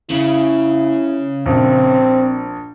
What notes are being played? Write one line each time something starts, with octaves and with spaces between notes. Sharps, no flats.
C#3 E4
A#1 C4